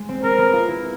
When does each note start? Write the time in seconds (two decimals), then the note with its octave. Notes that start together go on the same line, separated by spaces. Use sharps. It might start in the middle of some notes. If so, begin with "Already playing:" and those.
Already playing: G#3
0.09 C4
0.23 C4 A#4
0.38 B3
0.53 F4
0.68 E4